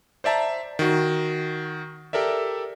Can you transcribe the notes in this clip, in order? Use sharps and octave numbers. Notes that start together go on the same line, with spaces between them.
C5 D5 E5 A5 A#5
D#3 F#4
G4 A4 A#4 D5 E5